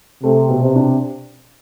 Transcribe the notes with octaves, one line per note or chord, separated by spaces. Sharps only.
C3 A3
B2
C3
D4